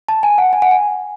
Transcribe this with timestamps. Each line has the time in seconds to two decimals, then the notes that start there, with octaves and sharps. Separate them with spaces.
0.08 A5
0.23 G#5
0.38 F#5
0.53 G#5
0.62 F#5
0.71 G#5